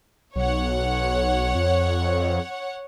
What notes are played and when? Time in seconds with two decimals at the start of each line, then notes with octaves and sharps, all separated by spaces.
0.36 B1 C#5 F#5
1.55 F2